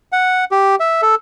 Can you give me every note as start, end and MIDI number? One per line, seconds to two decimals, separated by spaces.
0.12 0.45 78
0.51 0.75 67
0.80 1.01 76
1.02 1.15 69